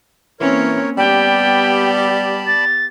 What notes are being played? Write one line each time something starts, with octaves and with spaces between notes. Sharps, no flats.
E3 A#3 C4 C#4 A#4 C#5
G3 B3 G4 D5 G5 A5 B5
A6